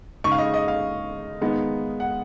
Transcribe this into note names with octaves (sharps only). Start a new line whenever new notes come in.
C#3 G#3 D#4 C#6
F5
D#5
D#5
F5
D#3 G#3 B3 D#4
F#5